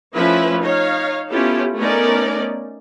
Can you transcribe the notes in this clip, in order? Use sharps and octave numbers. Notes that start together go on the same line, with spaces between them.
F3 A3 C#4 E4 B4 E5
D#4 C#5 F5
B3 C#4 E4 F4 G4 A4
A3 B3 C#4 D#4 A#4 D5